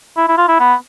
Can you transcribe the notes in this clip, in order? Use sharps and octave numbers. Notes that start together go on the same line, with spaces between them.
E4
E4
F4
E4
B3